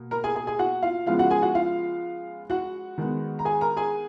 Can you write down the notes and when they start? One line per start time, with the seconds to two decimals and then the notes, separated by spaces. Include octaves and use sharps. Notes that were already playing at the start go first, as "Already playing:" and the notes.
Already playing: B2 A#3
0.11 A#4 A#5
0.24 G#4 G#5
0.36 G#4 G#5
0.47 G#4 G#5
0.59 F#4 F#5
0.83 F4 F5
1.06 C#3 F3 G#3 B3 F4 F5
1.19 F#4 F#5
1.31 G#4 G#5
1.42 F#4 F#5
1.55 F4 F5
2.50 F#4 F#5
2.98 D#3 G#3 B3
3.39 A#5
3.45 G#4 G#5
3.61 A#4 A#5
3.77 G#4 G#5